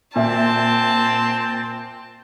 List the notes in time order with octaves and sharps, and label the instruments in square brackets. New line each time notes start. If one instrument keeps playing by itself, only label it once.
[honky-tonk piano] A#2 E5 [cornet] C4 [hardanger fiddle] A5